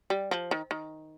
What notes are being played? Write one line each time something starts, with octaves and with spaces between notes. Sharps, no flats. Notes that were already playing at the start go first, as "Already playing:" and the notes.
G3
F3
D#3
D#3